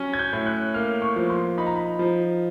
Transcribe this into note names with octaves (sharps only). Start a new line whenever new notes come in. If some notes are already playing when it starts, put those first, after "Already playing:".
Already playing: F#3 C#4
G#6
G6
A2
F#6
A#3 F6
C#6
F3
C6
D#4 B5
A#5
B5
F3